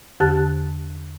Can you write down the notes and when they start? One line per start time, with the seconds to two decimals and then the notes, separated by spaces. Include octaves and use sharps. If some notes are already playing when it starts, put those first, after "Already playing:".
0.20 E2 D3 G4 A5 F#6 A6